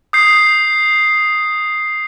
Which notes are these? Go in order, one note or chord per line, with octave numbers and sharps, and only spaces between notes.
D#6 G6 C7